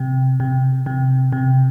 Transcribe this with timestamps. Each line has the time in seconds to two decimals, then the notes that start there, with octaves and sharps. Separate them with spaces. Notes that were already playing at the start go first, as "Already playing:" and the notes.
Already playing: C3
0.40 C3
0.86 C3
1.32 C3